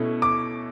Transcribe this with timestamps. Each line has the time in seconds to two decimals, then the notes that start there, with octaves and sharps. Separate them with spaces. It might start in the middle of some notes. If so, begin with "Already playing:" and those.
Already playing: B2 A3 C#4 E4
0.22 D6